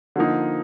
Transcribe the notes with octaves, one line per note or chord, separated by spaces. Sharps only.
D3 F3 A#3 D#4